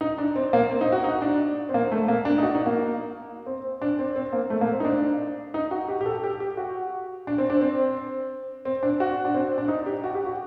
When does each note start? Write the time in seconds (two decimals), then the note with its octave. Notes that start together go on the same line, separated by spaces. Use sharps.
0.01 D#4
0.18 D4
0.36 C4
0.53 A#3
0.70 C4
0.81 D#4
0.92 F#4
1.04 D#4
1.22 D4
1.69 C4
1.74 A#3
1.92 A3
2.08 A#3
2.25 D4
2.38 D#4
2.43 F#4
2.55 D#4
2.66 A#3
3.46 C4
3.82 D4
3.99 C4
4.16 C4
4.33 A#3
4.50 A3
4.61 A#3
4.73 C4
4.80 D#4
4.85 D4
5.54 D#4
5.71 F#4
5.89 G4
6.01 G4
6.06 A4
6.24 G4
6.40 G4
6.57 F#4
7.27 D4
7.38 C4
7.50 D4
7.61 C4
8.65 C4
8.83 D4
9.00 F#4
9.25 D4
9.34 C4
9.58 D4
9.68 D#4
9.86 G4
10.04 F#4
10.15 G4
10.26 F#4